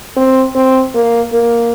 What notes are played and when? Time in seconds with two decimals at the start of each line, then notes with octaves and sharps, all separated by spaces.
0.17 C4
0.56 C4
0.95 A#3
1.33 A#3